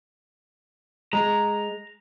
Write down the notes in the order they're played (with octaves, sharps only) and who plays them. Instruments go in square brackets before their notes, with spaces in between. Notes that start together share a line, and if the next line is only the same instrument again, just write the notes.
[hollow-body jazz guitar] G#3 [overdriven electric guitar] A#5